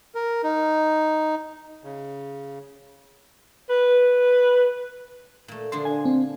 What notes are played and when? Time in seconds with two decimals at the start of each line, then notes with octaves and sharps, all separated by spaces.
0.15 A#4
0.43 D#4
1.84 C#3
3.69 B4
5.48 A#2 A3
5.72 D3 F3 D4 C6
5.85 G#5
6.05 C4